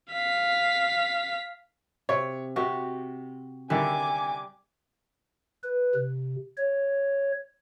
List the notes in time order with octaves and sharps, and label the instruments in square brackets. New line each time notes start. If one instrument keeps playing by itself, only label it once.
[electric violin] F5 B6
[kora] C3 [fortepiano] C#5
[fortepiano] C3 [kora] F#4 G4
[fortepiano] D3 D#3 E4 [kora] G3 [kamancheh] G#5 D6
[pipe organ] B4
C3
C#5